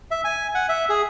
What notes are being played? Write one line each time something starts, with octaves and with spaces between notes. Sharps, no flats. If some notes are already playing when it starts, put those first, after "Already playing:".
E5
G#5
F#5
E5
G#4